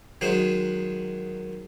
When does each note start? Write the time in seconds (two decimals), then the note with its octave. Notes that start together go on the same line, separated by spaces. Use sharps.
0.21 D#3 F#3 G#3 C5